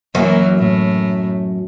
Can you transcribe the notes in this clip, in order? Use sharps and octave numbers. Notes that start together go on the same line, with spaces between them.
F#2 E3 F#3 A#3
A2